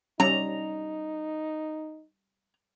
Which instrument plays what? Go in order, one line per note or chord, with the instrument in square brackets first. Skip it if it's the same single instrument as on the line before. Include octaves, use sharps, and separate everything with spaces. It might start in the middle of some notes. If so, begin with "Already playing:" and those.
[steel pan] G3 C#4 [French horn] D#4 [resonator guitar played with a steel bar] A#5